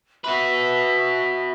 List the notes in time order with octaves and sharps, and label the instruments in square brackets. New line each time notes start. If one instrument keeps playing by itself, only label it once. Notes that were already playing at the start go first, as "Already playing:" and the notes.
[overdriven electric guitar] F#4 B4 [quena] E5